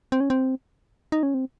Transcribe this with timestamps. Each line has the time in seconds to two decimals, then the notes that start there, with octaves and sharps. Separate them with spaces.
0.12 C4
0.20 C#4
0.30 C4
1.12 D#4
1.23 C#4
1.34 C4